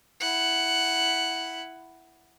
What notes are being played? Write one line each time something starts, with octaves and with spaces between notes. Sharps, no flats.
E4 F#5